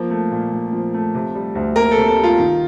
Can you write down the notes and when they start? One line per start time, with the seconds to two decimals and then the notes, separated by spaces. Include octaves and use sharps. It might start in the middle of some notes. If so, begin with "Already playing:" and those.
Already playing: F3 A#3
0.10 A3
0.31 A#2
0.52 A#2
0.73 F3
0.94 A3
1.15 C3
1.35 G3
1.55 D2
1.76 A#3 A#4
1.91 A4
1.97 C3
2.07 A4
2.18 G3
2.23 F4
2.39 D#3